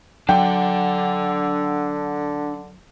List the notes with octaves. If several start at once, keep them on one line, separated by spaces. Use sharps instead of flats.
D3 F#3 D4 F#5 G5